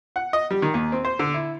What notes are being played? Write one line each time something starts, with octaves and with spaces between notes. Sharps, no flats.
F#5
D#5
G3
D#3
D#2
C4
C5
D3
E4